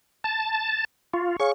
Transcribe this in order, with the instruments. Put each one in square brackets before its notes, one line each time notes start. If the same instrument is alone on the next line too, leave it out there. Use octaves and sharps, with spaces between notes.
[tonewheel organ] A5
[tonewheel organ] F4 [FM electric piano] C#6
[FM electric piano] G#4 C#5 F5 [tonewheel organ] C#6